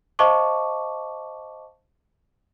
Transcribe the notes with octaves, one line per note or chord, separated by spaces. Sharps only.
C5 D#5 F5 A5 C#6 D6